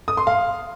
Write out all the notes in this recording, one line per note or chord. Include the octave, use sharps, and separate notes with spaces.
D#6
C6
F5